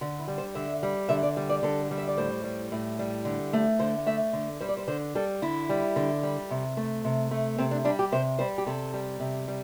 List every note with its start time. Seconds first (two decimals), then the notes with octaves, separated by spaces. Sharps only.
0.01 D3
0.19 E4
0.28 G3
0.38 C5
0.55 D3 E5
0.83 G3
1.09 D3 E5
1.23 D5
1.37 G3
1.49 D5
1.63 D3 A4
1.91 G3
1.98 E5
2.08 D5
2.17 A2 C5
2.44 G3
2.72 A2
2.99 G3
3.25 D3
3.53 A3
3.79 D3 C5
4.06 A3 E5
4.33 D3
4.61 G3 C5
4.69 D5
4.77 C5
4.88 D3 C5
5.15 G3 A4
5.42 D3 E4
5.69 G3
5.96 D3
6.23 G3
6.51 C3
6.77 A3
7.05 C3
7.31 A3
7.58 C3 C4
7.71 D4
7.85 G3 D4
7.99 G4
8.12 C3 C5
8.39 G3 C5
8.58 G4
8.66 C3 A4
8.94 G3
9.20 C3
9.48 G3